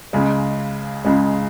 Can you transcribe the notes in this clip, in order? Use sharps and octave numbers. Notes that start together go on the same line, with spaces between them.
C#2 C#3 G#3
C#2 C#3 G#3